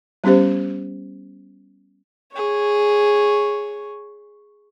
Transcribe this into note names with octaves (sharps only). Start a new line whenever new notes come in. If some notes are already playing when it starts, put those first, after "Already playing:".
G3 B3 C#4 G4 C5
G#4 C#5